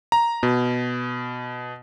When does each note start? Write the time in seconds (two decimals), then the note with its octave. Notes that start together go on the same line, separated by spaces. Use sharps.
0.12 A#5
0.43 B2